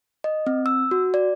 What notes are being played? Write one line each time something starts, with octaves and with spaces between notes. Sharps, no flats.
D#5
C4
E6
F#4
D5